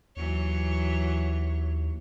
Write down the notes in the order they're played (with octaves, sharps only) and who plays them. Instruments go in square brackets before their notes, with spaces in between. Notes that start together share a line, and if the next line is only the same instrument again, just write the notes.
[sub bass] D#2 [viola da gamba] E3 F#3 C#5